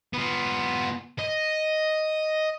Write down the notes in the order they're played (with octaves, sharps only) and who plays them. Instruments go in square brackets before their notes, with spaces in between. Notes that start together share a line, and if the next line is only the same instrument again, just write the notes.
[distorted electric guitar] B3 F4
D#5